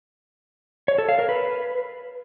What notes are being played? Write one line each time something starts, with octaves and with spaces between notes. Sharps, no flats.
C#5
A4
F5
A#4
B4